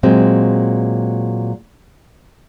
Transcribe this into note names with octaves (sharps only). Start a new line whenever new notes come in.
A#2 F#3 G#3 C4